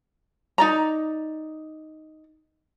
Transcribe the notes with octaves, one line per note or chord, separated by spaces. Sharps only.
D#4 D5 A#5